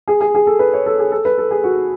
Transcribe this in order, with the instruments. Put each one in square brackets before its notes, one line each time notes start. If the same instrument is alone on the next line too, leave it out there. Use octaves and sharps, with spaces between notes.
[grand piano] G#4
G#4
G#4
A4
B4
C#5
A4
G#4
A4
B4
A4
G#4
F#4